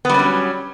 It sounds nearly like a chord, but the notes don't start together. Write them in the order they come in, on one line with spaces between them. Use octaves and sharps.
B3 G3 C#4 F#3